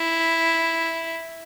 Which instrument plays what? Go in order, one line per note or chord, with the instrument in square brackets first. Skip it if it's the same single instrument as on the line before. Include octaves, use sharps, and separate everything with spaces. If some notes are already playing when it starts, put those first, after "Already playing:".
Already playing: [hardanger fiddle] E4